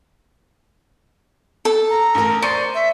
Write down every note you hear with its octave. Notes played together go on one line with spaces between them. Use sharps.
A4
A#5
A1 A#4
C5 D5 C#6 C#7 D#7
E5